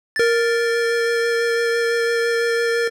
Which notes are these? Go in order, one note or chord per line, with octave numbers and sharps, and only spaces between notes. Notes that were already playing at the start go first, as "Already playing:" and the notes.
A#4 A6